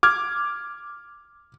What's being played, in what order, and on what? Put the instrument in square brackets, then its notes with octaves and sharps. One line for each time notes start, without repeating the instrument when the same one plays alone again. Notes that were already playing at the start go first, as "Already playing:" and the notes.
[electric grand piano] D6 F6 G#6